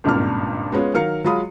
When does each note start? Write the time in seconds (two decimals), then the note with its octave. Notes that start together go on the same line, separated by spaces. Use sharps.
0.04 G#1 C#2 G2 A#2 D4 F6
0.72 G#3 B3 C#4 F4
0.94 D#3 F#3 A#4 F5 F6 C#7
1.24 F#3 G#3 F4 B5 D#6